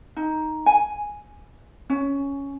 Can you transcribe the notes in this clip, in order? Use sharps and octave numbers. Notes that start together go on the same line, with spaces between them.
D#4
G#5
C#4